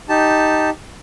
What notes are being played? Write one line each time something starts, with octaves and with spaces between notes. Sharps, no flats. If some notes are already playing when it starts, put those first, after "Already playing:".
D#4 G4 A5